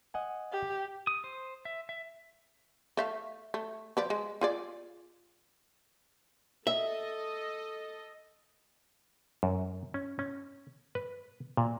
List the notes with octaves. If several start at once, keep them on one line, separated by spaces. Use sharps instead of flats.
D#5 F#5 G#5
G4
D#6
C5
E5
E5
A3 E5 F5
A3
F3 B4 D5
G#3
F4 G#4 D5
A4 D#5 E5
F#2
C#4
C#4
B4
A#2